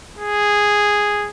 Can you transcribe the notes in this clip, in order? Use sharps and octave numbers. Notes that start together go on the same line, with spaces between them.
G#4